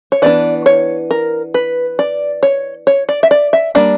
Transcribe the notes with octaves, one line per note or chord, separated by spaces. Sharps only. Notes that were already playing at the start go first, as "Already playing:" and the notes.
C#5
E3 B3 D4 D5
C#5
A#4
B4
D5
C#5
C#5
D5
E5
D5
E5
G3 A#3 D4 D5